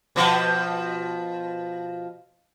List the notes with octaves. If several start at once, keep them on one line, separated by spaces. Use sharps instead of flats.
B2 F3